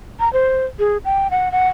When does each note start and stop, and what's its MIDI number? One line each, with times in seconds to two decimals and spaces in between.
0.20 0.32 82
0.33 0.66 72
0.79 0.97 68
1.05 1.30 79
1.30 1.52 78
1.52 1.68 78